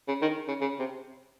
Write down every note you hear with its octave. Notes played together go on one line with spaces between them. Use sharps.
C#3
D#3
C#3
C#3
C3